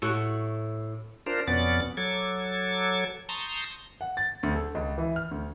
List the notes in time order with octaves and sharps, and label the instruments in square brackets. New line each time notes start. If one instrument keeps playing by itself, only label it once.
[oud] A2 F#4
[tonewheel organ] D4 F4 A#4 C5
F2 B2 B3 C#4 D5 A6
F#3 A4 D6 G#6
A5 A#5 C6 C#6 D#6 G6
[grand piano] F#5
A6
D2
A4
C#2
E3
F6
D2